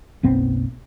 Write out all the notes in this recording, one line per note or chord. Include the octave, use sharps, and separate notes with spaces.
F#1 B1 B3 C4